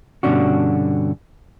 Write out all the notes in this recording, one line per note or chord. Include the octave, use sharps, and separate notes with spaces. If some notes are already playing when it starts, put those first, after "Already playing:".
G2 B2 D3 C#4 D4 F#4